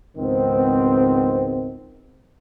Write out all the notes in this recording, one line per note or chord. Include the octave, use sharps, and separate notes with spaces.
C#2 G#2 D#3 B3 C4